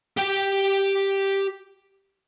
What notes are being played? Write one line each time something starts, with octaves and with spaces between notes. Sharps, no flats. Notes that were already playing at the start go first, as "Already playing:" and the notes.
G4 G5